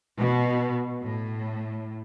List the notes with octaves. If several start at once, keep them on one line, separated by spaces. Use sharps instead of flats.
B2
A2